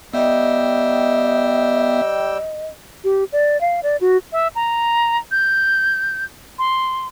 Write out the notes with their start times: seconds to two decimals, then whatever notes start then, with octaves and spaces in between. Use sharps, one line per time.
0.14 G3 B3 D#5 E5 G5 E6
3.04 G4
3.32 D5
3.61 F5
3.83 D5
4.01 F#4
4.32 E5
4.55 A#5
5.31 G6
6.59 C6